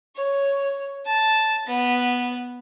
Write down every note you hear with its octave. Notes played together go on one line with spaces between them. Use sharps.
C#5
A5
B3